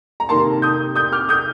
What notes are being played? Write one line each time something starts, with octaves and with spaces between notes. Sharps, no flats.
A#5
C3 D#3 A#3 A5 C6
D#6 G6
D#6 G6
D6 F6
D#6 G6